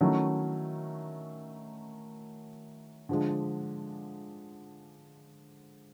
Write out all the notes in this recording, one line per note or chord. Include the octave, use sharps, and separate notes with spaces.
D#3 F#3 A3 C#4 E4
D3 F3 G#3